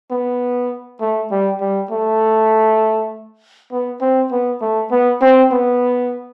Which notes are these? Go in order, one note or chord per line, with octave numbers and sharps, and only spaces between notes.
B3
A3
G3
G3
A3
B3
C4
B3
A3
B3
C4
B3